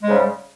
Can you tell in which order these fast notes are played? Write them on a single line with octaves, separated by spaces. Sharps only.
G#3 G#2 C#3 G3